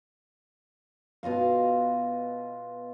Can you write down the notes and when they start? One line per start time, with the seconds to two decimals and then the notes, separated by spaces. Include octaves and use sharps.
1.23 B2 F4 D#5 F5